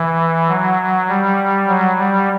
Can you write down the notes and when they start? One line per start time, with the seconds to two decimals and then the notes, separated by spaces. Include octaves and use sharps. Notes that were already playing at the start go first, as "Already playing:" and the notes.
Already playing: E3
0.48 F#3
1.09 G3
1.68 F#3
1.98 G3